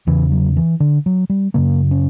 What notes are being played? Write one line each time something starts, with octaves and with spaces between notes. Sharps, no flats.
E2 C#3 E3
F#3
E3
D3
F#3
G3
F#2 C#3 A#3
C#4